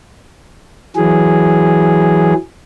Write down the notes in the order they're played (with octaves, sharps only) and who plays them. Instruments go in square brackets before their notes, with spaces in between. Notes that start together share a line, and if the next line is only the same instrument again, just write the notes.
[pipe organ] E3 F#3 G#4